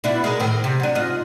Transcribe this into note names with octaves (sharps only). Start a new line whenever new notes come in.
B2 D4 E4
G#3 A#4
A2 D#3 C4
C3
F#3 D4
G#2 F4 D#5